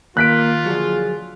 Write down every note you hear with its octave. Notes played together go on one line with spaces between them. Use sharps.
D#2 A#3 F4 F#6 B6 D7
D3 F3 F#3 G#4